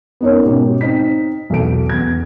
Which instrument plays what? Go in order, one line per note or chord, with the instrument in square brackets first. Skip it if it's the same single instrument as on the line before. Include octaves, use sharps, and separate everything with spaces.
[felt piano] B3 C#4 D#4 A#4 C#5
G#2 B2 C#4 G4
C4 D#4 B6
B1 E2 A4 D7
E2 G#6